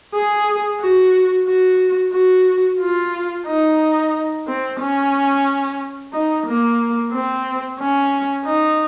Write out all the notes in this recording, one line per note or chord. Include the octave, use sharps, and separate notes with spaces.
G#4
F#4
F#4
F#4
F4
D#4
C4
C#4
D#4
A#3
C4
C#4
D#4